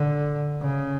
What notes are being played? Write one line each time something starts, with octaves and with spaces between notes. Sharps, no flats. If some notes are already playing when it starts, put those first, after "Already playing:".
Already playing: D3
C#3